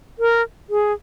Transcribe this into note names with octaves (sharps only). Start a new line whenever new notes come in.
A#4
G#4